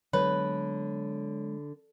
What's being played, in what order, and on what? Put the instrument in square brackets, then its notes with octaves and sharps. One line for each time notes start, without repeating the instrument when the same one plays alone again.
[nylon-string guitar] D3 [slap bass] F#3 G#3 B3 [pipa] B4 [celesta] C#5